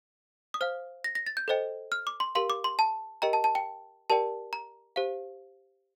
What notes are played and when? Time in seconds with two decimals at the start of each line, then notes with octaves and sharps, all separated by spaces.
0.54 D#6
0.61 C5 F5 F6
1.04 A#6
1.15 A#6
1.26 A6
1.37 G6
1.48 A4 C5 D#5 G5
1.92 F6
2.07 D6
2.20 C6
2.35 G4 A#4 F5 C6
2.50 D6
2.64 C6
2.79 A5
3.22 G4 A#4 D#5 G5 A#5
3.33 A5
3.44 A5
3.55 G5
4.10 G4 A#4 D5 G5 A5
4.53 A#5
4.96 G4 C5 F5